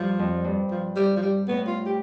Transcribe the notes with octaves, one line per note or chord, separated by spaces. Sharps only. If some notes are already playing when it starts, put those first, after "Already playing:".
Already playing: G2 F3
F2
G2
F3
G3
F3
G3
A2 B3
F4
G4